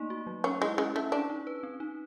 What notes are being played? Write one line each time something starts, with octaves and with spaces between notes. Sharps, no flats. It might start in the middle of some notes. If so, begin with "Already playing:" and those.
Already playing: A3 A#3 D#4
F#4
F#3
C#4 A4
G#3 E4
G#3 C#4
A3 C#4
D4 G#4
D#4
B4
C4
D#4